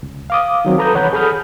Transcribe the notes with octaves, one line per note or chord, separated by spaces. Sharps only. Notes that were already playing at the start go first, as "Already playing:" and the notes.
C#2
F5 D6 D#6
D#3 F#3 C4
A4 B4 A#5 D#6 G6
C2 E3 C#5 F#5 B5 G6
G#4 A4 B5 D#6 F6 G6